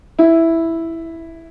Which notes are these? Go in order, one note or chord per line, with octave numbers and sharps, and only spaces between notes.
E4